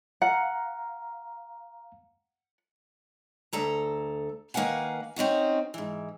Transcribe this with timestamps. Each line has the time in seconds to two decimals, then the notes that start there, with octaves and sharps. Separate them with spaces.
0.22 F5 F#5 A#5
3.53 D2 A4 A#5
4.54 D#3 A#3 B4 F5 F#5 G#5
5.16 C4 C#4 D#4 F#4
5.74 G#2 E3